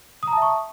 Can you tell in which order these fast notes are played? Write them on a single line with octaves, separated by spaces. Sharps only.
D#6 A#5 A5 E5 C#6